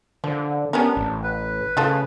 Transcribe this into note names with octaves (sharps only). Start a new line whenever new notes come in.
D3 F3
B3 C#4 D4 G4 A#4
A1
B4
C#3 A3 F4 A5